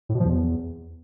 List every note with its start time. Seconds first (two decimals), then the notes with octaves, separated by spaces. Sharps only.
0.09 A2
0.15 B2
0.20 F3
0.25 E2